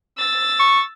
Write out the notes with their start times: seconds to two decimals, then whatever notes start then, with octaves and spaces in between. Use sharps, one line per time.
0.18 E6 A6
0.59 C#6